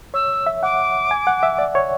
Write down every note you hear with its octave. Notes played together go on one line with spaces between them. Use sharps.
C#5 E6
E5
F#5 D6
G#5
F#5
E5
D5
C#5